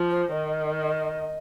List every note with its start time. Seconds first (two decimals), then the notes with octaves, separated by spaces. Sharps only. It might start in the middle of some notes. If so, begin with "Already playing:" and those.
Already playing: F3
0.11 C5
0.32 D#3 D#5